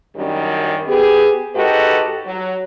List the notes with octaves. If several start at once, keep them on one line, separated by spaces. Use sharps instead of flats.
F#2 D#3 F#3 G3 D4
B3 G4 G#4
G#2 F#4 G4 A4 B4 D#5
F#3